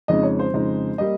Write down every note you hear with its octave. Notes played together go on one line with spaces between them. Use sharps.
F2 C#3 G#3 D#4 D#5
C#5
C5
F2 C#3 G#3 D#4
G3 A#3 D#5